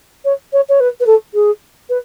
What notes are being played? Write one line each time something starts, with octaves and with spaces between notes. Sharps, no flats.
C#5
C#5
C#5
B4
B4
A4
G#4
B4